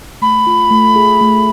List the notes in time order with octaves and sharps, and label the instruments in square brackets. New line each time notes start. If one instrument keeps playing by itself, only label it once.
[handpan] A3 [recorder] B5
[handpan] F4
A3
G#4
A3